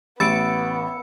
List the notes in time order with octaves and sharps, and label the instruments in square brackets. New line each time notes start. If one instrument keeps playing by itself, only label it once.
[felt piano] A1 [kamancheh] B3 [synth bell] B5 E6 C#7 [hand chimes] A6 D7